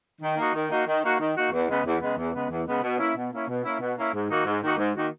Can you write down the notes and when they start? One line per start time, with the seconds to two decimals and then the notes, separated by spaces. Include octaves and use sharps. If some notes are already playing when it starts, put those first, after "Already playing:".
0.21 D#3
0.38 A#3 D#4 F#4
0.54 D#3
0.70 A#3 D#4 F#4
0.87 D#3
1.03 A#3 D#4 F#4
1.20 D#3
1.35 A#3 D#4 F#4
1.52 E2
1.69 C#3 G#3 B3
1.85 E2
2.01 C#3 G#3 B3
2.17 E2
2.34 C#3 G#3 B3
2.50 E2
2.67 C#3 G#3 B3
2.83 B2
2.99 A#3 C#4 E4
3.16 B2
3.32 A#3 C#4 E4
3.48 B2
3.64 A#3 C#4 E4
3.80 B2
3.97 A#3 C#4 E4
4.14 G#2
4.30 D#3 A#3 D#4 F#4
4.46 G#2
4.63 D#3 A#3 D#4 F#4
4.78 G#2
4.95 D#3 A#3 D#4 F#4